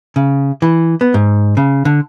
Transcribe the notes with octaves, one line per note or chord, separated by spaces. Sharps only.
C#3
E3
B3
G#2
C#3
D3